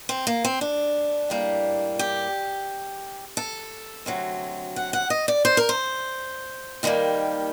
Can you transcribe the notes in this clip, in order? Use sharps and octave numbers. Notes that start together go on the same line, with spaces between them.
C4
A#3
C4
D4
A2 G3 A#3
G4
A4
D2 C3 F#3
F#5
F#5
D#5
D5
C5
A#4
C5
D#2 D#3 G3 A#3